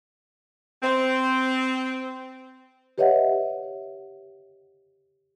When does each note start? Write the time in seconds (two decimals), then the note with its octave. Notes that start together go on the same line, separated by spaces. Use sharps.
0.83 C4
2.98 G4 B4 C#5 D#5 E5 F#5